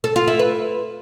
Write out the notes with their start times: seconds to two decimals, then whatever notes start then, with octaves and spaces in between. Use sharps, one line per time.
0.04 A4
0.16 F4
0.28 E4
0.39 B4